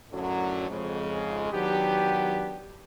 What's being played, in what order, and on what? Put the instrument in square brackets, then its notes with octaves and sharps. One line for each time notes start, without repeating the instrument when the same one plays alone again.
[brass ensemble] F#2 A2 D3 F#3
F2 G#2 C#3 G#3
D#3 F#3 B3 D4 G4